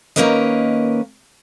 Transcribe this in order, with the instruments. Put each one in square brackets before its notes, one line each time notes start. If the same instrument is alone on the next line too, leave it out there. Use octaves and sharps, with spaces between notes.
[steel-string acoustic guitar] D#3 A#3 C#4 A#4 B4 D#5